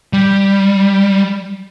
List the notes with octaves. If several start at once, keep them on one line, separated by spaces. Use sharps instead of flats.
G3